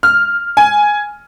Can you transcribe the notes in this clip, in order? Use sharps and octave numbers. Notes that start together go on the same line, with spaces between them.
F6
G#5